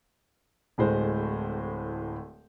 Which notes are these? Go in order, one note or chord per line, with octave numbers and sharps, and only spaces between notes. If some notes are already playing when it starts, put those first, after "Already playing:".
D1 A2 G#3 C5